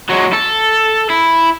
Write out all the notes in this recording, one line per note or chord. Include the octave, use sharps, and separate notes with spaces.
F#3 G#3
A4
E4